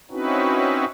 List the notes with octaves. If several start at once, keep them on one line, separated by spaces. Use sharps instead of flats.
C4 C#4 D#4 E4 F#4 B4